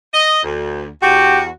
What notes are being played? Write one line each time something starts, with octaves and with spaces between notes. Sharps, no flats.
D#5
D2
E2 F#4 G4